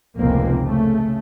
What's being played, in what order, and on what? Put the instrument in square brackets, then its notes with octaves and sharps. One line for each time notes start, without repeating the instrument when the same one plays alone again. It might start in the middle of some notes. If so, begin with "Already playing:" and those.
[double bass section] F1 C#2 A2 A#3 C4
C#3 A3